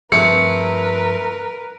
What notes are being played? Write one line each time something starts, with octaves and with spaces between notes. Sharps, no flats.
G2 F3 A3 C4 G#4 A#4 B4 C#7